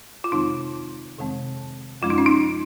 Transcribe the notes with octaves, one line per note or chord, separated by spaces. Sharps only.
F4
F2 C3 D#3 G#3 C4 D#4
F2 C3 D#3 G#3 C4
F#2 F3 G#3 C#4 F4
D#4
C#4
D#4